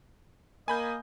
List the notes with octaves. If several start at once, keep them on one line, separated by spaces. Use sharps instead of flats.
A#3 D#5 G#5 B5 G6